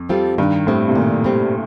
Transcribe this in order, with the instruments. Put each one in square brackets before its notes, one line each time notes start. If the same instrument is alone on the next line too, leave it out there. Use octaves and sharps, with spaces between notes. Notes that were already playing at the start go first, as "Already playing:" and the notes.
Already playing: [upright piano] F2
[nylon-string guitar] G3 C4 F4 A4
[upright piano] G2 [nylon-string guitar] D#3
[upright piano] A2 [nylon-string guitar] G3 C4
[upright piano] C3
[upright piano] A#2 [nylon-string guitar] D#3
[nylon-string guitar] G3 C4